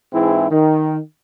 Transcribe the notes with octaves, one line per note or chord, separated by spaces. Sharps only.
G#2 E3 C4 E4 G#4
D#3